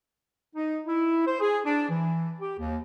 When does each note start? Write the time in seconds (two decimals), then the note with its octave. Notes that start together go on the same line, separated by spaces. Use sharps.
0.56 D#4
0.87 E4
1.27 C5
1.41 G#4
1.66 D4
1.89 E3
2.41 G4
2.60 D#2